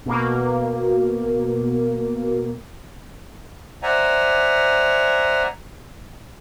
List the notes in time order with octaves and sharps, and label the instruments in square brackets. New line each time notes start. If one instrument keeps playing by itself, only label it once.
[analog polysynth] B2 A#3
[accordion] C5 D5 E5 F#5 G#5 A#5